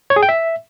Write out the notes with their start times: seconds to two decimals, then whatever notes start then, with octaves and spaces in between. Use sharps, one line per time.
0.10 C#5
0.16 G#4
0.23 G5
0.29 E5